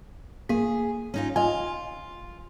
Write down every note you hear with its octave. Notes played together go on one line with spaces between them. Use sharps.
A#3 G#4 B6
C#4 D#4 F4
F4 D#5 G#5